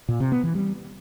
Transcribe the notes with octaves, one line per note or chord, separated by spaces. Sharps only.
A#2
C3
B3
E3
G3